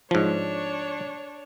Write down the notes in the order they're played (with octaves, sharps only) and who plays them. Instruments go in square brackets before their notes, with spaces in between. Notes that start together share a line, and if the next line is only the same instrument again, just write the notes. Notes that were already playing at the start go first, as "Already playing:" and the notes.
[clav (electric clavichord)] G#2 F3 [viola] D4 C#5